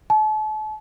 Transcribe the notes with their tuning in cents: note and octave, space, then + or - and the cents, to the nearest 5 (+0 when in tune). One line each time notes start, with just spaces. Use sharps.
A5 -40